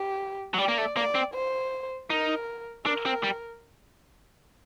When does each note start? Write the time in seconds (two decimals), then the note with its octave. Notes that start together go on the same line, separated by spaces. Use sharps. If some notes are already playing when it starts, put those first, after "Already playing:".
Already playing: G4
0.54 F#3
0.58 G3 D5
0.68 A#3
0.78 A3
0.96 A#3 D5
1.15 C4
1.34 C5
2.10 D#4 A#4
2.86 D4 A#4
3.06 C4
3.24 G3